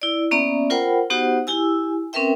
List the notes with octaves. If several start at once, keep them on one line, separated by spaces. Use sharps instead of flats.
E4 D5
A#3 B3 C#4 D5 E5 A#5
F4 A#4 C5 F#5 G5 B5
B3 D#4 F#4 G4 C5 F#5
E4 G4 G#5 E6
C4 C#4 A#4 B4 E5 G5